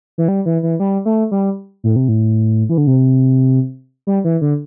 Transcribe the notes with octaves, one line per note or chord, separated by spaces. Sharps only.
E3
G3
E3
E3
G3
A3
G3
A2
C3
A2
E3
D3
C3
G3
E3
D3